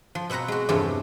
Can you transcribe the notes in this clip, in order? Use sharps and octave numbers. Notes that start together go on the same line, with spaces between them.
F3
B2 C4 B4 F#5 A#5
G#3 F#4
E2 G2 C3 F3 A3 C#4